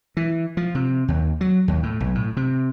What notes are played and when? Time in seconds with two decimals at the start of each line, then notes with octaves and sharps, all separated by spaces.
0.17 E3
0.57 F3
0.75 C3
1.08 D#2
1.41 F#3
1.68 D#2
1.83 A2
2.00 B1
2.15 A2
2.37 C3